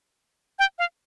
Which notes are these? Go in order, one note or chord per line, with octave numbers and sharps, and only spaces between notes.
G5
F5